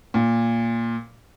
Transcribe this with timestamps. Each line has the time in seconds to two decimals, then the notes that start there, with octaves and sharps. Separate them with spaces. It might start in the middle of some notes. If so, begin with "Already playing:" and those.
0.14 A#2